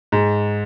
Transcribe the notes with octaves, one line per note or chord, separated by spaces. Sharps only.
G#2